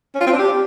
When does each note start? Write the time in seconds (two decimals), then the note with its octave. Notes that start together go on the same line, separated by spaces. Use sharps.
0.15 C#4
0.21 F4
0.27 C4
0.33 D4
0.39 G4